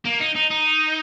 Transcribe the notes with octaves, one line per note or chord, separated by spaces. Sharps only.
A#3
D#4
D#4
D#4